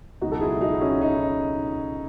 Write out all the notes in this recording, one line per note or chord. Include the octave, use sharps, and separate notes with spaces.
C#2 B2 F#3 D#4 F#4
A4
E4 G#4
D#4 F#4
C#4 E4
D#4